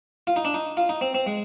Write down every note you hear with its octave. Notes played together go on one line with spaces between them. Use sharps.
F4
D#4
D4
D#4
F4
D#4
C4
C4
G#3